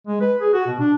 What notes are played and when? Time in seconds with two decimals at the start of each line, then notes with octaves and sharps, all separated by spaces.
0.07 G#3
0.21 B4
0.41 G#4
0.54 F#4
0.67 B2
0.80 D4